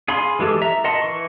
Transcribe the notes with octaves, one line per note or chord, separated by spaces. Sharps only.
G#4 F5 G#5 B5 C6
E3 G#3 G4 A4
E5 A#5
A#4 D#5 F#5 A5 C6
E3 C#6